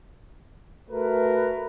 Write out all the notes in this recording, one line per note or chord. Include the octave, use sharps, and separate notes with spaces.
A3 F#4 A#4 B4